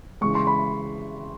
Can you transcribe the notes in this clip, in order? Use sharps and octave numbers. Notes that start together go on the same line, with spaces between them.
C#3 E3 G#3 C#6
C6
B5